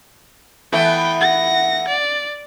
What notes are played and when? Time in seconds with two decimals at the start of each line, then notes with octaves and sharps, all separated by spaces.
0.72 E3 A3 B3 G5
1.21 F#5 A#6
1.88 D5